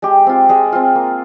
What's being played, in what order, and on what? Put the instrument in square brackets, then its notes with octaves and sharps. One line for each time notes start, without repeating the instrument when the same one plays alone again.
[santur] G#3 G4
C4 F4
G#3 G#4
C4 F4
A#3